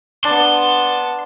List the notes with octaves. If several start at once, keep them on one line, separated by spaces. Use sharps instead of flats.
B3 D4 A5 C6